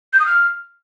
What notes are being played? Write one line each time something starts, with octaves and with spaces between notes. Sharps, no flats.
G6
D#6
F6